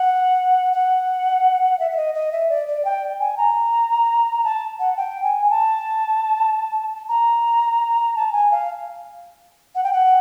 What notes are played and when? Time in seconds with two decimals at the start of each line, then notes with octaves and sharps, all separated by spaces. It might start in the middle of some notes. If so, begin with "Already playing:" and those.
Already playing: F#5
0.73 F#5
1.79 E5
1.91 E5
1.96 D#5
2.14 D#5
2.32 E5
2.50 D5
2.68 D5
2.85 G5
3.20 G#5
3.38 A#5
4.44 A5
4.79 F#5
4.97 G5
5.23 G#5
5.50 A5
7.09 A#5
8.16 A5
8.32 G#5
8.51 F5
9.75 F#5
9.84 G5
9.93 F#5